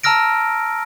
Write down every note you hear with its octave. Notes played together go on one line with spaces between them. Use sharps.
A5 A#5 E6 F6 A#6 D7